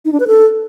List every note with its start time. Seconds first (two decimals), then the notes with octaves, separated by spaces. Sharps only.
0.05 D#4
0.13 D4
0.20 B4
0.27 A4